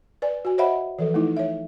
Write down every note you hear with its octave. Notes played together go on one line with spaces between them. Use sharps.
B4 D5 G#5
F#4 G#5
C5 C#5 D#5 E5 F#5 B5
E3 F3 A4 B4
A3 D#4 E4
C#5 E5